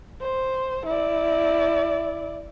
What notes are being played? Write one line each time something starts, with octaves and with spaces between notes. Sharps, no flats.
C5
E4 D5